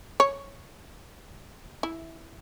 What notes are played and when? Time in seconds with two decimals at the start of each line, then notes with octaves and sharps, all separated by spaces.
0.20 C#5
1.83 E4